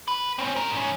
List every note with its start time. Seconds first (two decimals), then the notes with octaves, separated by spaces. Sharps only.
0.08 B4
0.39 C4 C#4
0.56 G3 A#4
0.72 G#2 C#4